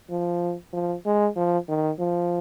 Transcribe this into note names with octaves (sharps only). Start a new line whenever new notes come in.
F3
F3
G#3
F3
D#3
F3